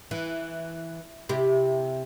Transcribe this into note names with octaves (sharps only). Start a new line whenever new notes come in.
E3
C3 E4 G4